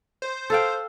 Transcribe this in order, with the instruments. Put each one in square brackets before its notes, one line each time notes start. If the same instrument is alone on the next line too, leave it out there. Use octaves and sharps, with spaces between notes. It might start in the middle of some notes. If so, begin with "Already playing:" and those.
[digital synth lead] C5
[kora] A4 F5 G5